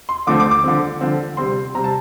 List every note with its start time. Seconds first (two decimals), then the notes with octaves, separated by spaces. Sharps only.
0.09 C6
0.27 D3 F3 A3 C4 D6
0.40 D6
0.51 D6
0.64 D3 F3 C4
1.01 D3 F3 C4
1.37 C3 G3 C4 C6
1.75 C3 G3 C4 A#5
1.84 A5